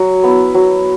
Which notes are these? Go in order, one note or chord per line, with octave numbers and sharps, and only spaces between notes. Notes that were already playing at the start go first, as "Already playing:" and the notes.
Already playing: F#3
B3 E4
F#3